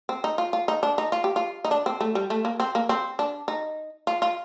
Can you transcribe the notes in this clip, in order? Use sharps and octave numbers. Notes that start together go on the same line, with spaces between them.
C4
D#4
F4
F4
D#4
D4
D#4
F4
G4
F4
D#4
D4
C4
A3
G3
A3
A#3
C4
A#3
C4
D4
D#4
F4
F4